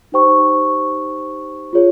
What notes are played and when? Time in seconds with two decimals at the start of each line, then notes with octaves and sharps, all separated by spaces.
0.12 D#4 G4 C5 G5 C#6
1.73 F4 G#4 C#5